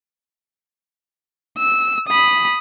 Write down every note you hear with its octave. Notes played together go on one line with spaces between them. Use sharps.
E6
B5 D#6